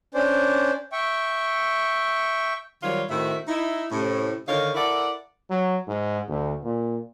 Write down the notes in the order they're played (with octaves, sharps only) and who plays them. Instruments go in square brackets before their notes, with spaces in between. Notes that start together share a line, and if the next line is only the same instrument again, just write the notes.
[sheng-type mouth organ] C#4 D4 C5 D5
E5 G5 C#6
[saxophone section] D#3 F#3 G3 F4 C5 C#5
A2 D#3 C4 F#4 E5
D#4 E4
A2 C3 C#4
D3 D#3 D#4 A#4 C#5 F5
E4 A4 A#4 D5 E5 F#5
[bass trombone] F#3
G#2
D2
A#2